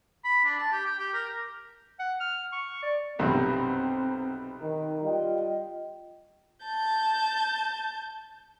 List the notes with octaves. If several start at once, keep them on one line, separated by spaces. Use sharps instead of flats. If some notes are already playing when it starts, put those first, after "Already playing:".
B5
D4
A5
G4
G5
G4
A#4
F#5
F6
C#6
D5
B1 G2 C3 C4
D#3
G3 F4 D#5 G5
A5 G6